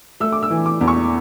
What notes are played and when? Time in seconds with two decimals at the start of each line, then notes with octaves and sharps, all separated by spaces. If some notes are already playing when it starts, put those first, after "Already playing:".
0.20 A3 E6
0.32 D6
0.43 E6
0.50 E3
0.66 D6
0.81 E2
0.88 C#6